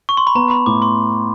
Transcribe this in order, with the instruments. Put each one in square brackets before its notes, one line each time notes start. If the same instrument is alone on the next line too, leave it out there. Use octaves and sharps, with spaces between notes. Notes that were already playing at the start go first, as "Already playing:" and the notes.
[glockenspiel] C#6
C6
B5
[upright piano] B3 [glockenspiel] A#5
[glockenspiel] B5
[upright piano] A2 [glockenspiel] D6
[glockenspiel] C6